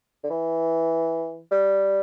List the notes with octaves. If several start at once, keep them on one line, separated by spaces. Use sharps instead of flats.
D3
E3
G3